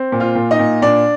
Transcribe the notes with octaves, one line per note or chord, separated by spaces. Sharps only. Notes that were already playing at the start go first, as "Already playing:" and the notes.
Already playing: C4
A#2
F4 F5
A#2
D#4 D#5
A#2
A#2 D4 D5